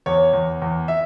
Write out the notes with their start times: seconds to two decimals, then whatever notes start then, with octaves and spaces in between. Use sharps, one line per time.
0.06 E2 C#5
0.33 E2
0.62 E2
0.88 E5